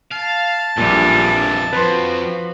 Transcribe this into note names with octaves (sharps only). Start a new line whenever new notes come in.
F5 A5
A#1 F2 A#2 E3 G3 D4 G#4
F2 F3 F#4 B4 C6